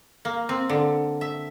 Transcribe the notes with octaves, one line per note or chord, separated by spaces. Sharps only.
A#3
C4
D3
E5